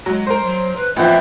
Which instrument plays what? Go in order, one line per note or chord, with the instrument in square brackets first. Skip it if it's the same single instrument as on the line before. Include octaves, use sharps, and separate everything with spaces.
[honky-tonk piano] F#3 [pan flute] G#3
[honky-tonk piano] A#4 C5
[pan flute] F#3
B4
[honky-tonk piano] A1 F3 [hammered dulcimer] A#2 B3 C4 [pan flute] E5